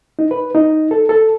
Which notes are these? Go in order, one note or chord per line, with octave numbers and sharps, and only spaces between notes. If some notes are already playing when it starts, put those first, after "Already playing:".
D#4
B4
D#4
A4
A4